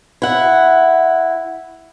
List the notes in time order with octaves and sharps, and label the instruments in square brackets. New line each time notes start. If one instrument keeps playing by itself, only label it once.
[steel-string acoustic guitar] E4 F#5